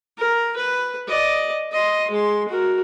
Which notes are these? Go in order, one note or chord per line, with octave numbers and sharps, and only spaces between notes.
A#4
B4
D5 D#5
D#5 C6
G#3 C6
F#4 A#4